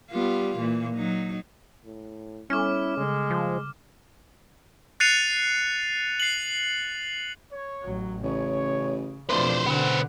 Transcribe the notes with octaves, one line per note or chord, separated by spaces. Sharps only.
G3 B3 F4
A#2 E3
F#3 D#4
A2
G3 B3 C#4 E4 A4 D6 F6
C#3 G#3 A4
F3 F#6
F#6 A6 C7 C#7 D#7 F7
C7 F#7
C#5
A1 F#3
A1 C#3 C#5
D1 B2 F3 A3 C4 B4 C5 D5
B2 D3 B3 C5 F#5